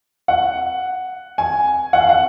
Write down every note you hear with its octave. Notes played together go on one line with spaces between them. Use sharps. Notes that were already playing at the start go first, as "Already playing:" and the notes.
F#5
G#5
F#5
F5
F#5